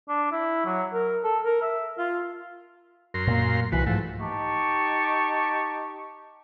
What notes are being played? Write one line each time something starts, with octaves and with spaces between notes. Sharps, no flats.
D4
E4
F#3
A#4
A4
A#4
E5
F4
F#2 A#4 C6
A#2 A#3
C2 E3 F#4 B4
G#2 F3 A3
D#4 G4 A5 C#6